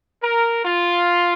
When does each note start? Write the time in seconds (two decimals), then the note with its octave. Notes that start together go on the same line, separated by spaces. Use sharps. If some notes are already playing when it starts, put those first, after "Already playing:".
0.23 A#4
0.65 F4